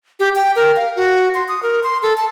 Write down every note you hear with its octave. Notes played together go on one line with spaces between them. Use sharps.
G4
G5
A#4
F5
F#4
C6
D#6
A#4
C6
A4
A5